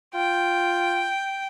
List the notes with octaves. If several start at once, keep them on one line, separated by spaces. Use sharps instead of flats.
F4 G5